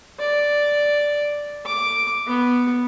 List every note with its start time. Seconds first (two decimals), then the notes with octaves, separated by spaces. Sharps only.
0.19 D5
1.66 D6
2.27 B3